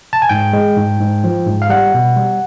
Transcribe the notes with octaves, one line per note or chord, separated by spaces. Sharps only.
A5
G#5
G#2 G5
G#3
G#2
G#2
F3
G#2
F5
G3 F#5
B2
G3